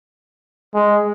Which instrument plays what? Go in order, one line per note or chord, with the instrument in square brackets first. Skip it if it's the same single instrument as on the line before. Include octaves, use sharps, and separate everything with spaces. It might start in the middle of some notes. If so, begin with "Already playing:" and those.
[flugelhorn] G#3